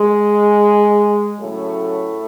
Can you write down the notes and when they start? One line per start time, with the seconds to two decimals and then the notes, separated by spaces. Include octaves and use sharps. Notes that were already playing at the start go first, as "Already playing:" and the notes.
Already playing: G#3
1.39 A2 C#3 F#3 A3